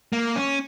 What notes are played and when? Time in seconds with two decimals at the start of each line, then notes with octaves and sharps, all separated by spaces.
0.13 A#3
0.36 C#4